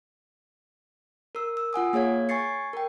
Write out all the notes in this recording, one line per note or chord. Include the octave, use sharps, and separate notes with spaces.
A#4 E6
E6
F4 F#5 G#5 D#6
A#3 G#4 C#5 F5 G#6
G#5 C#6 G#6 A6 C7 C#7
A#4 G5